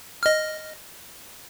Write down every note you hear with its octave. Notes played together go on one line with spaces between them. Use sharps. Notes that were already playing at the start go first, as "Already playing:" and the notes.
D#5 F6